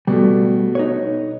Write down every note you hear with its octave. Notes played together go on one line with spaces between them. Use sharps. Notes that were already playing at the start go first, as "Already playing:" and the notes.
B2 G3 A3
D#4 B4 C#5